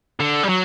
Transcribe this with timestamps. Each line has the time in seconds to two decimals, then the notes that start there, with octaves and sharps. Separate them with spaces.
0.20 D3
0.43 G3
0.49 F#3